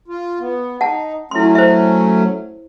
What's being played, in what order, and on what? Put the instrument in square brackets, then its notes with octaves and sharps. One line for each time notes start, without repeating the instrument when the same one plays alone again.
[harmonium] F4
B3
[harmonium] D#4 [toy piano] F#5 A5
[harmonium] F#3 A3 C#4 [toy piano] E4 C6
[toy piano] C5 E5